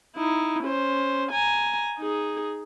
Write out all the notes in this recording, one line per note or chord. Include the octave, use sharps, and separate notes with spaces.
D#4 E4
C#4 C5
G#5 A#5
D#4 G#4